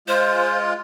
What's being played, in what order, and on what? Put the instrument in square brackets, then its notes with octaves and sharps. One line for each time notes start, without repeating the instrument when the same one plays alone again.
[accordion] G#3 F4 [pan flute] C5